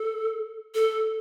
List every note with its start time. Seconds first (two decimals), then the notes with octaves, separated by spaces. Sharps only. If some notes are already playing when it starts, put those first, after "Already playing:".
Already playing: A4
0.75 A4